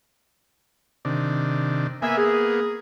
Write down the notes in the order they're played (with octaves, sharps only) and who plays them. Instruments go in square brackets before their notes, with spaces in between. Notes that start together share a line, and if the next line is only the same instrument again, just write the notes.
[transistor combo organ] C3 D#3 D4
[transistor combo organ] A#3 B3 [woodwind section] E5 G#5
[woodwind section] G#4